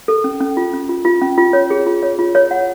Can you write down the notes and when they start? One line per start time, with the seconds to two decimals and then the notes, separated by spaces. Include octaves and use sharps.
0.08 A4
0.24 C#4
0.41 C#4
0.57 F4
0.73 C#4
0.89 F4
1.05 F4
1.21 C#4
1.38 F4
1.53 C#5
1.70 G#4
1.86 F4
2.03 C#5
2.19 F4
2.35 C#5
2.51 F#5